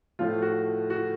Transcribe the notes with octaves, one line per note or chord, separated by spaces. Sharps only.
A2 F3 A3 F4
F#4
F#4